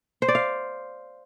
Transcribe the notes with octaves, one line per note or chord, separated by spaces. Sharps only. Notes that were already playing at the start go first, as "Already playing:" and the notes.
C5
D5
F5